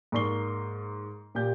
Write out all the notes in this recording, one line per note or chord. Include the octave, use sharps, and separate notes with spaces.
G#2 A#3 D5 C#6 C7 G7
A#2 G4 G6